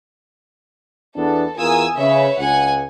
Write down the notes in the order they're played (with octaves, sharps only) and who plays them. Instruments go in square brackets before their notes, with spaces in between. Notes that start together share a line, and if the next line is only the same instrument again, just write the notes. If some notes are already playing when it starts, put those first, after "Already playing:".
[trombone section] E2 B3 D4 [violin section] A4
[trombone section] E2 F4 A#4 [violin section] G#5 D#6 E6
[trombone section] C#3 [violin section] B4 C#5 E5
[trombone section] C#2 [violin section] F#5 G#5